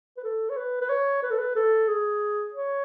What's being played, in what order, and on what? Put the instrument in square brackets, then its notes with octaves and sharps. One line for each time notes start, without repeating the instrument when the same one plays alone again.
[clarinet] B4
A4
C#5
B4
B4
C#5
B4
A4
B4
A4
G#4
C#5